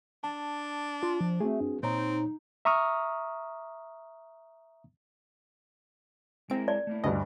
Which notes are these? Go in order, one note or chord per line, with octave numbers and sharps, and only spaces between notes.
D4 A5
F4
F3
A3 C4 F#4 G#4
G2
A#2 C4 D#4 C#5 A#5
E5 A#5 C#6 D#6 F6
G#3 C4 E4 A#4 D7
D5
A3 A#3 E4
D2 G2 D#5